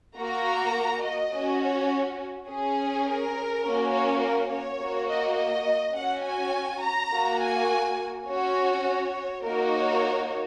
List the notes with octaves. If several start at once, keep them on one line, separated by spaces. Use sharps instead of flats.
A#3 F#4 A#5
D#5
C#4 F#4
C#5
C#4 G#4
A#4
A#3 C#4 F#4
C#5
A#4
C#5
A#3 F#4
D#5
D#5
C#4 F#4 F#5
G#5
A#5
A#3 F#4
G#5
C#4 F#4 C#5
C#5
A#3 D#4 F#4 A#4
C#5